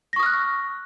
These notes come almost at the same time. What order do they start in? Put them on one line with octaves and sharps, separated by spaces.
A#6 C#6 D#6 F6 F#6